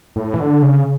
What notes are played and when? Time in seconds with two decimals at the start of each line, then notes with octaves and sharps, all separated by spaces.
0.16 A2
0.34 E3
0.40 D3
0.62 C#3